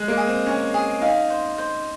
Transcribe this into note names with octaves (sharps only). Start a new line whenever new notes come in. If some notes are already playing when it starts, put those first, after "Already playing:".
Already playing: G#3
A#3
G#4
C4
C#4 A#5
G#4
D#4 F5
C5
C5